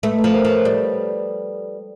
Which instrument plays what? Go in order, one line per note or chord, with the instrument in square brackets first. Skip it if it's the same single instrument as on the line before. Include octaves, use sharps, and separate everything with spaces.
[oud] A3 [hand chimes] A4 B4
[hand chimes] A4 B4
[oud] F3
[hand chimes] A#4 C5
[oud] F3
[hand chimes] B4 C#5
[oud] G3 [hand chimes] A4 B4